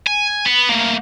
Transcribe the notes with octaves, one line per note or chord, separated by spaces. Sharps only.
G#5
B3
A3 A#3